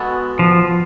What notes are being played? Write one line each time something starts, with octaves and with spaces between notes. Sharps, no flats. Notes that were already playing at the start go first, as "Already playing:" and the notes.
Already playing: G#3 B3 F#4 A4
F3